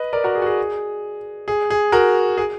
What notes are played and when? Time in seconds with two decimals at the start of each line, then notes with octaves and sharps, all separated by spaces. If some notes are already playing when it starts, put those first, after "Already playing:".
Already playing: B4 D#5
0.13 A#4 D5
0.24 F#4 A#4
0.35 G#4
0.42 F#4
0.46 G#4
1.48 G#4
1.70 G#4
1.92 F#4 A#4
2.37 G#4